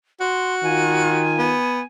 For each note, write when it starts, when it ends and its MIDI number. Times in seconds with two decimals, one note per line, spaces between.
0.21 1.25 66
0.21 0.55 84
0.63 1.59 51
0.63 1.59 65
0.63 1.83 80
1.39 1.80 59